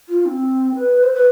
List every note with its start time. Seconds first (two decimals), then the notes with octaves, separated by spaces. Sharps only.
0.09 F4
0.26 C4
0.75 B4
1.04 C5
1.14 B4